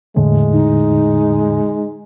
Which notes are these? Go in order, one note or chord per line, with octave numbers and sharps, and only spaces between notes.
E2 A2 D3 G#3
D#4